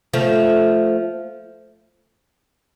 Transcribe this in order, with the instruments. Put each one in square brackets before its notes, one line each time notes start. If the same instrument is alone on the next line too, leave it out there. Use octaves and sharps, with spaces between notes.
[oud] F3 A3